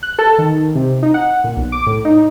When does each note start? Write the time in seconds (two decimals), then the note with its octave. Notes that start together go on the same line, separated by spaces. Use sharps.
0.03 F#6
0.19 A4
0.38 D#3
0.75 C3
1.03 D#4
1.14 F#5
1.44 A#2
1.57 B1
1.72 D6
1.87 A2
2.05 D#4